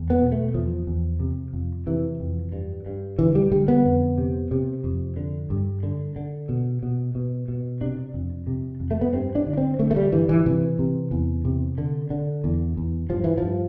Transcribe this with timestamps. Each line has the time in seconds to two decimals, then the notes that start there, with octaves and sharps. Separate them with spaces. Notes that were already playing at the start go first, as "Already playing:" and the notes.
Already playing: E2
0.10 B3
0.22 B2
0.32 A3
0.54 E2 F3
0.87 E2
1.20 C3
1.54 F2
1.86 C3 E3
2.20 F2
2.52 G2
2.86 G2
3.18 D3 E3
3.35 G3
3.52 D3 G3
3.68 B3
3.85 F2
4.18 C3
4.51 C3
4.84 F2
5.17 D3
5.50 G2
5.83 D3
6.16 D3
6.49 B2
6.83 B2
7.15 B2
7.48 B2
7.81 C3 D4
8.14 F2
8.47 C3
8.80 F2
8.91 A3
9.01 B3
9.13 G2 C4
9.35 D4
9.46 D3
9.53 D4
9.57 C4
9.79 D3 A3
9.91 A3
9.96 G3
10.12 G2 E3
10.29 E3
10.46 C3 E3
10.79 C3
11.11 E2
11.45 C3
11.78 D3
12.10 D3
12.44 E2
12.77 E2
13.10 G2 F3
13.24 E3
13.38 G2 F3